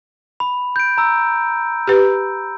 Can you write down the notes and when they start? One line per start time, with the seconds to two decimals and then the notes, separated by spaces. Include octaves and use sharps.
0.40 B5
0.76 G6 D7
0.98 A#5 E6
1.88 G4 B4